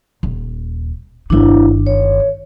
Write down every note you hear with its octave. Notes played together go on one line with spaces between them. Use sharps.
D#1
G1 D#3 D4 E4
C#5